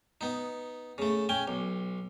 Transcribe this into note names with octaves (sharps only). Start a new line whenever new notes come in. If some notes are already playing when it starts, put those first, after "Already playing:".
B3 D#4
C#3 A3
C#4 G5 G#5
B1